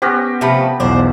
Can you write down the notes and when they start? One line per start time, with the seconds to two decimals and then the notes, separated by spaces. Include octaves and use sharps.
0.02 B3 C#4 G4 C5 C#6 A#6
0.41 C3 F3 A3 E5 A5 B5
0.80 B1 E2 D4 C5